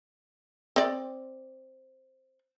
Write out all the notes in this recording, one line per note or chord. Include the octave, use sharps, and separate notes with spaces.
C4 D5